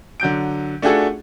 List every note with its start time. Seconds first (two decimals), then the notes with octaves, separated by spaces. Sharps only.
0.20 D3 F#3 G6 D7
0.82 A3 D4 F4 F#4 G#4 A4